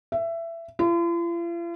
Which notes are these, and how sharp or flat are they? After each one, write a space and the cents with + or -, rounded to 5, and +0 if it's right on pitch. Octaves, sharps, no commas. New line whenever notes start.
E5 +20
F4 -45